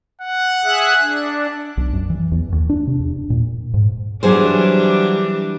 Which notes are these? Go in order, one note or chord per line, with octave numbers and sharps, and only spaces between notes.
F#5
G#4 E5 F#6
D4
B1
F#2
E3
E2
D#2
D4
C3
E2
A#2
G#2
E3 F#3 G3 D4 G#4 C5